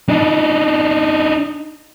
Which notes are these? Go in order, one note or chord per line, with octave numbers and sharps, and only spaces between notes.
D4 D#4